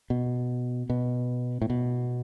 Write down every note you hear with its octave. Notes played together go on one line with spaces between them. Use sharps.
B2
B2
A2
B2